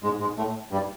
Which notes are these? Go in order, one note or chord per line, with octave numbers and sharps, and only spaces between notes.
G#2 G#3
G#2 G#3
A2 A3
G2 G3